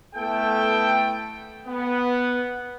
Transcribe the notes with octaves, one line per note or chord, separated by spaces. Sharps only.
A3 B3 E4 A4 G5
B3